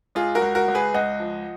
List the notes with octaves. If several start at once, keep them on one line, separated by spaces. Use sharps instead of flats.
C#2 F4 G#4
F#4 A#4
C#2
F#4 A#4
C#2
G#4 B4
C#2 D#5 F#5
F3